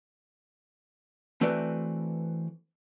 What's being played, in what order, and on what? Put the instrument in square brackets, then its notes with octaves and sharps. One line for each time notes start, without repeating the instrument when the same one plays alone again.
[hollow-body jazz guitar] E3 A3 C4 F#4 B4 D5